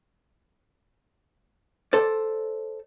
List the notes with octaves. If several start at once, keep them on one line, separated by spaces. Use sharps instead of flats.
A4 C5 D5